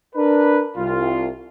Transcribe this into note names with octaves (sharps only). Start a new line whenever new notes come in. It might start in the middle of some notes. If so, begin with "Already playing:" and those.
D4 A#4 B4
C2 F4